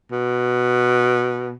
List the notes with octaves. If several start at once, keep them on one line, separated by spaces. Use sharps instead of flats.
B2